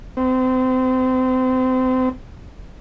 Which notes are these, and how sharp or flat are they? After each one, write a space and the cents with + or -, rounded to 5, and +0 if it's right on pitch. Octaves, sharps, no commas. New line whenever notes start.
C4 -30